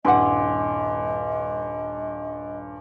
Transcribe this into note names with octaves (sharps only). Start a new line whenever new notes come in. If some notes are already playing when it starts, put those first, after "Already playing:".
D#1 G2 E4 D#5 F#5 G#5 C6 D6